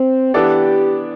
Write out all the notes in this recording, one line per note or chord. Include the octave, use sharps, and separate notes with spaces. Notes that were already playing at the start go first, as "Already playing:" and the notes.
Already playing: C4
E3 B3 D4 G4 A4 D5